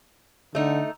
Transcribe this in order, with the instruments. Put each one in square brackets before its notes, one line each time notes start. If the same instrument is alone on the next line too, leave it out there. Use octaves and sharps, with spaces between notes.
[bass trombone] D3 [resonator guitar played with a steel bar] A3 D#4